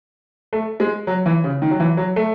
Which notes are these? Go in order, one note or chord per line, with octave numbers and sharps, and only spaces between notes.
A3
G#3
F#3
E3
C#3
D#3
F#3
E3
F#3
A3